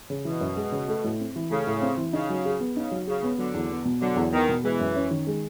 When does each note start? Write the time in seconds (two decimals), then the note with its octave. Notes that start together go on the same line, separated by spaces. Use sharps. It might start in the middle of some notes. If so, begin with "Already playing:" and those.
0.10 C#3
0.25 B2 E3
0.41 F#2
0.56 G#3
0.72 C#3
0.88 A3
1.04 A2
1.20 C4
1.36 E3
1.50 C#3 A3
1.67 A2
1.82 C4
1.97 E3
2.13 C#3 D#4
2.30 F#3
2.45 G#4
2.60 B3
2.76 C#3 D#4
2.91 F#3
3.07 C#3 G#4
3.23 B3
3.38 D3 F#3
3.54 E2
3.70 B3
3.85 B2
4.02 D3 F#3
4.16 E2
4.32 D#3 B3
4.49 B2
4.63 E3 G#3
4.80 F#2
4.96 C#4
5.11 D#3
5.27 G#3